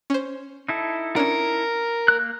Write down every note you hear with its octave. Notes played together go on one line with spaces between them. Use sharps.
C#4 C5
D#4 E4 A4
C#4 D4 A#4
A#3 F#6